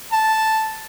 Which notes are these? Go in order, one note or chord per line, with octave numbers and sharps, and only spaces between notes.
A5